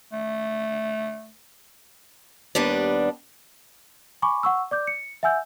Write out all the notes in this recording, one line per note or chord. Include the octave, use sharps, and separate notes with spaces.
A3
D#2 G3 B3 D4
G#5 B5 C#6 D6
F#5 C#6 E6
D5 D6 G6
C#7
E5 F#5 G#5 E6 G6